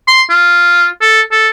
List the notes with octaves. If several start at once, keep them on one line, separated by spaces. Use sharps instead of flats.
C6
F4
A4
A4